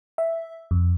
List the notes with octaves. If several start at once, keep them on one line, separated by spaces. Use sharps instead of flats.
E5
F2